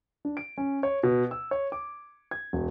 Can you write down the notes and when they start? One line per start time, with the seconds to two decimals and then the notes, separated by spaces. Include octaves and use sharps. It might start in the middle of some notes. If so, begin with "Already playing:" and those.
0.25 D4
0.37 D7
0.58 C#4
0.83 C#5
1.03 B2
1.31 E6
1.51 C#5
1.72 D6
2.31 G#6
2.53 E1